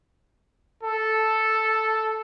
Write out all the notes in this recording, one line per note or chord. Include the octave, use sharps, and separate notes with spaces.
A4